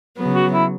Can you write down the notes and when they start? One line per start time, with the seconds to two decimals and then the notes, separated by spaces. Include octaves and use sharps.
0.17 C#3 F#3 B3
0.34 F#4
0.53 E4